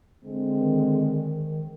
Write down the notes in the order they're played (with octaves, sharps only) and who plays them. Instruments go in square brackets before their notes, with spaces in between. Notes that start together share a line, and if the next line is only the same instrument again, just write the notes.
[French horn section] D3 G#3 C4
[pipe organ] D#3